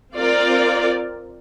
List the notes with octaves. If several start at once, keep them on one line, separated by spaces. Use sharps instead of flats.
C4 F4 A#4 D5